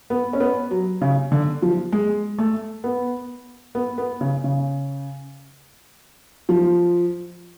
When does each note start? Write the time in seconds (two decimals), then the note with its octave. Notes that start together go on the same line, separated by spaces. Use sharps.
0.10 B3
0.33 C#4
0.40 B3
0.71 F#3
1.02 C#3
1.32 D3
1.62 F3
1.92 G#3
2.38 A3
2.84 B3
3.75 B3
3.98 B3
4.21 C#3
4.44 C#3
6.49 F3